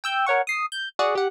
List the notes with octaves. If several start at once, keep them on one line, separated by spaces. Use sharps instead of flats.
G5 E6 G6
A#4 C#5 F#5 C#6
D#6 C7
G6
F#4 G#4 D5 F#5
G4 F#5